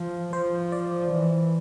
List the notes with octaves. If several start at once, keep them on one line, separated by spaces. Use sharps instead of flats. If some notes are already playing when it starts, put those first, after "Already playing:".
Already playing: F3 C5
F3 C5
D5
E3